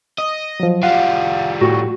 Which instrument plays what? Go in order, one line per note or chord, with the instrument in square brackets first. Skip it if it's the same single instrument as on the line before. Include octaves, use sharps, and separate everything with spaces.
[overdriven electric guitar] D#5
[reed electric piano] F3 F#3
[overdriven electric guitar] F3 G3 [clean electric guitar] F5 [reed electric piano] F#5
[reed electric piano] A2 G4 C#6 [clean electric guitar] F#4